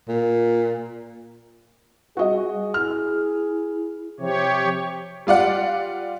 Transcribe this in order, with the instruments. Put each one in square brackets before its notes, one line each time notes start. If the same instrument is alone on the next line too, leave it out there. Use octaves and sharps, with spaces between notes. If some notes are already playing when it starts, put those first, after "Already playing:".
[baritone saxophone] A#2
[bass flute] G3 [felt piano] F#4 D#5 [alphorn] G#4
[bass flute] E4 [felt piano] F6
[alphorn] C3 [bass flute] F3 [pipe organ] G4 C#5
[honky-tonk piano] G3 F4 D5 F#5